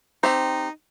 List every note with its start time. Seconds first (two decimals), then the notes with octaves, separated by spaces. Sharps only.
0.23 C4 D#4 G4 C5